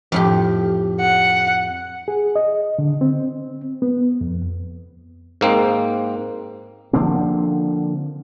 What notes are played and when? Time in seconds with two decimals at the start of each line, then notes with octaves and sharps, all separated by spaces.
0.12 F2 A2 G4
1.01 F#5
2.08 G#4
2.36 D#5
2.79 D3
3.01 C4
3.82 B3
4.21 F2
5.41 G#2 A#3 C4
6.93 D3 F3 A#3 C4